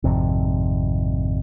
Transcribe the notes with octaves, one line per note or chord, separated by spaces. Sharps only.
G#1 F2 C3